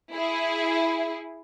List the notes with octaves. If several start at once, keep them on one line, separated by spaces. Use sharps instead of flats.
E4 G#4